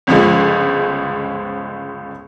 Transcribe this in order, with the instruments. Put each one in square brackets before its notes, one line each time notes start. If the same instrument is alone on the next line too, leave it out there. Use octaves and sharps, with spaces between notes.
[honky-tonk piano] G1 C#2 F3 G#3